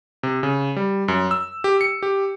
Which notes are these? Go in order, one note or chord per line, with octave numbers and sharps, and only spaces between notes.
C3
C#3
G3
F#2
E6
G4
C#7
G4